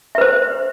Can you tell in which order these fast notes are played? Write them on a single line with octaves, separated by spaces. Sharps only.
E5 B4 C5